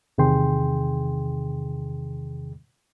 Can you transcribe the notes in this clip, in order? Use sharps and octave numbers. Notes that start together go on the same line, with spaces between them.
E2 C3 D#3 G#4 G5 C6